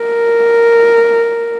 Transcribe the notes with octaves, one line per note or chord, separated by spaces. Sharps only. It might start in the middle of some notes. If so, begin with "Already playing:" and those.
Already playing: A#4